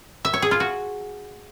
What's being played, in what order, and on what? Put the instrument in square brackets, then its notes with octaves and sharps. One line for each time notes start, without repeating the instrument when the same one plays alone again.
[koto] E5
C#5
G#4
F4
F#4